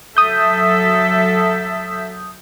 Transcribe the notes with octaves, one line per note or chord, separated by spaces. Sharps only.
F#3 A4 E5 D#6 G6